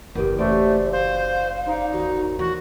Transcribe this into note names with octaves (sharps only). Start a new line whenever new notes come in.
F#1 E2 G4 A#4 D#6
F#2 A3 C5 D5 C6
C5 F5
D#4 C5 D5
D#2 F#4
E3 F#4